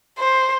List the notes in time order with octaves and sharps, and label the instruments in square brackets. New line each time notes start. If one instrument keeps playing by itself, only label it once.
[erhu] C5